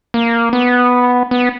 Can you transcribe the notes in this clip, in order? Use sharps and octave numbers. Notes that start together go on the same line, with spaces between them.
A#3
B3
B3